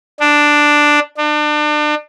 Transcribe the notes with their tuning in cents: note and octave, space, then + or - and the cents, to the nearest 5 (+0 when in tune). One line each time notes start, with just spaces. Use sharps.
D4 +5
D4 +35